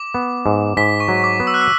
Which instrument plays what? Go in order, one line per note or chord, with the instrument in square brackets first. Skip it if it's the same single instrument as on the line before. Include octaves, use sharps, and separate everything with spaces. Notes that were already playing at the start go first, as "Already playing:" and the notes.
Already playing: [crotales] D6
[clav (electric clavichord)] B3
G#2
[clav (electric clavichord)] G#2 [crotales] B6
[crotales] C#6
[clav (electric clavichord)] F#3
[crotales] D6
[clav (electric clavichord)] B3
[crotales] E6
F#6
E6